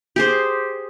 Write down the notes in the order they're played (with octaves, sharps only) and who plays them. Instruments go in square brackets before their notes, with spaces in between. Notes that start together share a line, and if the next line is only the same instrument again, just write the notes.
[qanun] G4 G#4 C5